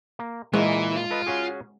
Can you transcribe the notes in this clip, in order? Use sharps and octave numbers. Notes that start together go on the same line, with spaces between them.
A#3
A#2 E3 G#3 A#3 E4
F4
A4 B4 D#5
C#4 F#4 G#4